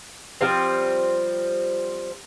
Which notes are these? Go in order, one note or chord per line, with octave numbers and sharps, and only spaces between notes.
F3 G3 C4